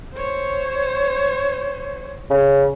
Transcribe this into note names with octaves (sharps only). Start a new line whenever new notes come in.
C5 C#5
C#3